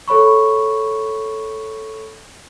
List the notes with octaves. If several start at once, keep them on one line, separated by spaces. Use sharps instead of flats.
A4 C#5 B5 C#6